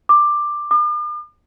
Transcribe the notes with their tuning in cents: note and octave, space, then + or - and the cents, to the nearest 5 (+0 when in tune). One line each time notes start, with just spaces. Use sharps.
D6 +10
D6 +45